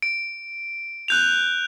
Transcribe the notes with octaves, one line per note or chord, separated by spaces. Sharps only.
D7
F#6 G6 F7